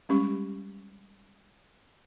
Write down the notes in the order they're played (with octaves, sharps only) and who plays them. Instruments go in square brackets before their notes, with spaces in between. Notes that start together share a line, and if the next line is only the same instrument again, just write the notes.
[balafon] G3 G#3 C#4 G4 C#6